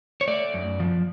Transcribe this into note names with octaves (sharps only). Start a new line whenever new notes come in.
C#5
A3 D5
F#2
F3